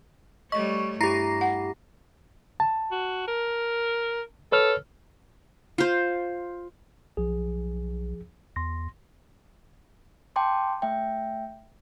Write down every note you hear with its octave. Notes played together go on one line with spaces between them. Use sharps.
G3 A3 C#5 D#5 C#6
G2 E4 G4 A#5 A#6 C7
F#5
A5
F#4
A#4
A4 B4 C#5 F6
F4 C5
B1 F3 G#4
E2 C6 A#6
G5 A5 C6 D6
A3 E5 G5